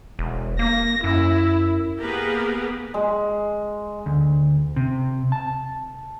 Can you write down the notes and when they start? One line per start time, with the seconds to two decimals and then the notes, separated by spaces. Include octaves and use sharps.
0.19 E1
0.59 A#3 A#6
1.04 F#2 E4
1.99 A#3 B3 G4 G#4 A#4 B4
2.94 G#3
4.06 D2
4.76 C3
5.32 A5